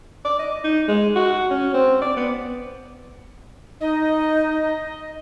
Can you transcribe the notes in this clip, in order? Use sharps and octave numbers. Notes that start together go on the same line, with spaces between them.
D5
D#5
D#4
G#3
F#4
C#4
C4
D5
B3
D#4 D#5